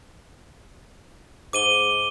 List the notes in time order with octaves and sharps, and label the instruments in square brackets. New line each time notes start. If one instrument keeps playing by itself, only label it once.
[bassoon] G#2 [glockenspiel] D6 D#7 G7